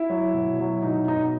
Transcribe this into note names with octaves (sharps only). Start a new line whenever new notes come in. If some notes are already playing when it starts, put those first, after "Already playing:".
Already playing: E4
F#3
B2
F#3
B2 D#4
B2 D#4